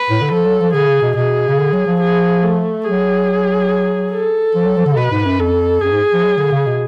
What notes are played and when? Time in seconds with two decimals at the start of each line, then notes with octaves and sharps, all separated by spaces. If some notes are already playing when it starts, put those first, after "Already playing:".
Already playing: B4
0.10 A2
0.21 D3
0.31 F3 A4
0.45 F#3
0.60 F3
0.74 D3 G#4
0.88 C#3
1.02 B2
1.16 B2 G#4
1.48 C#3
1.58 D3
1.73 F#3
1.86 F3
2.01 G#4
2.43 A3
2.85 F#3 G#4
4.13 A4
4.55 F3
4.65 F#3
4.76 F3
4.86 D3
4.92 C#3
4.97 B2 B4
5.11 G#2
5.25 F#2
5.39 F2 A4
5.81 F#2 G#4
5.92 G#2
6.13 F3
6.24 F#3
6.38 D3
6.52 C#3
6.66 B2